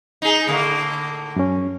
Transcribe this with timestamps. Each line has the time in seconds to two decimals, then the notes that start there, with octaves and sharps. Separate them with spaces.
0.22 D#4 G#4
0.47 A2 D3 A#3
1.36 F#2 C#4